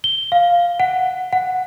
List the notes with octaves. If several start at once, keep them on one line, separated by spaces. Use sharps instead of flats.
G7
F5
F#5
F#5